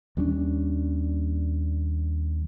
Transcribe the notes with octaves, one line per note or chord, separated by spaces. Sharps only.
D#2 G3 C#4 D4